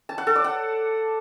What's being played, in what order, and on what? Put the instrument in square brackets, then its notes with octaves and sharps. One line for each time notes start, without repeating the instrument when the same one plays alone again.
[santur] A5
F#5
A4
D5
F#5